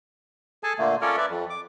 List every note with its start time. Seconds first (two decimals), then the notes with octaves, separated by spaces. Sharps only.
0.63 G#4 A4 G#5 A5
0.79 A#2 D3 A3 A#3
1.01 C#4 F4 A4 A#4 C#5 D5
1.17 B4 D5 E5
1.29 F2
1.50 D6